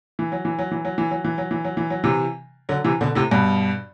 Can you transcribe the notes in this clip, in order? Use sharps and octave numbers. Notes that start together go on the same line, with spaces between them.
E3
F#3
E3
F#3
E3
F#3
E3
F#3
E3
F#3
E3
F#3
E3
F#3
C3 E3
D3 F#3
C3 E3
B2 D3
A2 C3
G2 B2